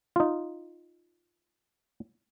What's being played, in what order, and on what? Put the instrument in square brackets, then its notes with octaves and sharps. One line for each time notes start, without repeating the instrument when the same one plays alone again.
[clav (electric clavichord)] D#4 F4